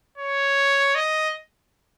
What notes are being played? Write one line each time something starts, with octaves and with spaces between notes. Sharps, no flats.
C#5
D#5